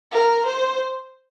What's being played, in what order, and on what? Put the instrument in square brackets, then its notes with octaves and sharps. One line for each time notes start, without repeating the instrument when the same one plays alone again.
[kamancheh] A#4
C5